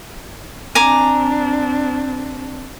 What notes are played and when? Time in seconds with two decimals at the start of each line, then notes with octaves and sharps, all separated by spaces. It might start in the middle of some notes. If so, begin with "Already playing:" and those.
0.75 C4 D4 G#5 A#5 D6